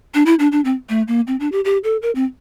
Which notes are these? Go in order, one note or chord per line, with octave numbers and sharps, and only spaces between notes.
D4
E4
D4
D4
C4
A3
A#3
C4
D4
G4
G4
A4
A#4
C4